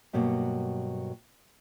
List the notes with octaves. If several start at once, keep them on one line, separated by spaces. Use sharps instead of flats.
G2 B2 F#3 A#3